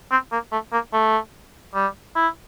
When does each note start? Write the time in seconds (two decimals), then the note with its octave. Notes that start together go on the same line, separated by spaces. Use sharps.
0.11 C4
0.32 A#3
0.52 A3
0.73 A#3
0.93 A3
1.74 G3
2.15 E4